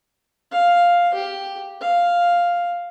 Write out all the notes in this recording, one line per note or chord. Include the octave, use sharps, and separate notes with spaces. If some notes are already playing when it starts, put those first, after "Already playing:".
F5
G4
F5